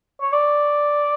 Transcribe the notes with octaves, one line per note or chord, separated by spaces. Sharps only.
C#5
D5